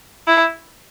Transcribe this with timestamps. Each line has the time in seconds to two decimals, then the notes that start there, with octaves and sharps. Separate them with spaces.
0.27 E4